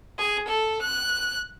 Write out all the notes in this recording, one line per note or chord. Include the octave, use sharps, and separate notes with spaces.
G#4
A4
F#6